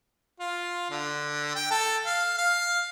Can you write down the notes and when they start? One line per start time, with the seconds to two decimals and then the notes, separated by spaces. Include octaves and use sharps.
0.40 F4
0.91 D3
1.55 G5
1.71 A4
2.06 F5
2.38 F5